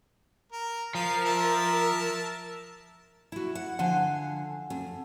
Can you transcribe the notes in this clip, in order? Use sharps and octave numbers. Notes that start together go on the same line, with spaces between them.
A#4
F3 A#4 F5 A#5
E5 A5
E4 F#4
F#5
D3 F3 F#5 G#5
F2